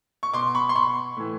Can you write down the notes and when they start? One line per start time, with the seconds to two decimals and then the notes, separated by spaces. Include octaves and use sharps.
0.23 C#6
0.33 B2 C6 D6
0.55 B5 C#6
0.69 C6
0.75 B2 B5 C#6
1.17 A2 E3